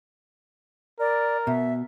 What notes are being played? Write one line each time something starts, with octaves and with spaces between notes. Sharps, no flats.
A#4 D5
B2 E5